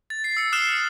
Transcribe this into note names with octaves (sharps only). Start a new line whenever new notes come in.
A6
C7
E6 C#7
D#6 F6 F#6 C7 E7 G7